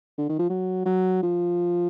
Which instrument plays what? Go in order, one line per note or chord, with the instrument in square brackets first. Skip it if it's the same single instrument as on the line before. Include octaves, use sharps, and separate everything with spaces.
[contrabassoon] D3
D#3
F3
F#3
F#3
F3